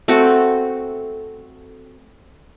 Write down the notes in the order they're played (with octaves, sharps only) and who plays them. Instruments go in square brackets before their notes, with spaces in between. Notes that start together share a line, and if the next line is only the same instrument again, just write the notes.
[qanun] A3 C4 F#4